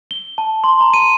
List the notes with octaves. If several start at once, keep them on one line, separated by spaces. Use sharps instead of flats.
G7
A5
C6
A#5
D#7